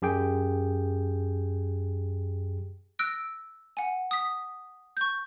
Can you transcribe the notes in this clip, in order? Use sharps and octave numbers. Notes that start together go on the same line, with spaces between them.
F#2 G4 G#4 G5
E6 F#6 A#6 D7
F#5 G#5
D#6 B6
C#6 G6